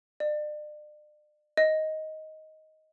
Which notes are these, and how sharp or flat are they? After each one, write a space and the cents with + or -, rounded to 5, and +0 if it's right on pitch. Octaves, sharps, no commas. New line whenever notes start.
D5 +40
D#5 +10